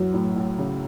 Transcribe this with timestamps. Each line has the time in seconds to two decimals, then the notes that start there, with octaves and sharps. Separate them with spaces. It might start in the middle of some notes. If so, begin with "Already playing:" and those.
Already playing: F#2 E3 F#3
0.14 A2
0.36 A2
0.58 C#3